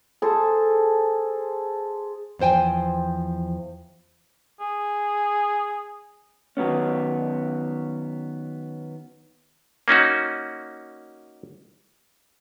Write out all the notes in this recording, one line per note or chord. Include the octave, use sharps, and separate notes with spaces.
G#4 A4 C5
E2 F3 C5 G5 G#5
G#4
D#3 F#3 B3 C#4
A#3 C#4 D#4 F#4